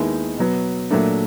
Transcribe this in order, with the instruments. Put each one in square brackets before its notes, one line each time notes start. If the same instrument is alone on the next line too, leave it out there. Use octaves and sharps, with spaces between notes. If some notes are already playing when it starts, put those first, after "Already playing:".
Already playing: [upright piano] D#2 D#3 G#3 B3 E4
B2 F#3 B3
A#2 F#3 A3 D4